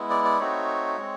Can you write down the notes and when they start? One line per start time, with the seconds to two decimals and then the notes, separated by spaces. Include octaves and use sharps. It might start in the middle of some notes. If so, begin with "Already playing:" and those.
Already playing: G#3 B3 E4
0.10 D5
0.25 D5
0.39 A3 C4 D#4 F#4 C#5
0.97 G#3 C4